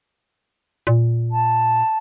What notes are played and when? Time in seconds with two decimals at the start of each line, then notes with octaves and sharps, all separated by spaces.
0.87 A#2
1.31 A5